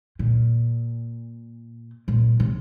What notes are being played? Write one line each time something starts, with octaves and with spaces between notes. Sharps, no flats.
A#2
A#2
C3